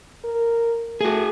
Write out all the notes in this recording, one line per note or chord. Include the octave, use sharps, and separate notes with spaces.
A#4
A3 F#4 G#4